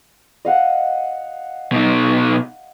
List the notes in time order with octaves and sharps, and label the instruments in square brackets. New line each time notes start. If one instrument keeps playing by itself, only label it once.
[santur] D#5 F5 F#5
[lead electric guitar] B2 D#4